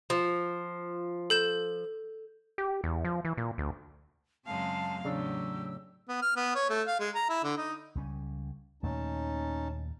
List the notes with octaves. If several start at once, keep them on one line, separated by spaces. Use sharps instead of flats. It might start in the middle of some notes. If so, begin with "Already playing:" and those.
F3
A4 G6 E7
G4
E2
F3
E3
A#2
D2
F#2 C#3 G#3 C4 F5 A5
E2 A2 C#3 F#3 D4 G4 E6
B3
F6
B3
C#5
A3
F5
G#3
A#5
E4
D3
D#4
C#2 G3 C#4
D#2 A#2 A3 C#4 D#4 A5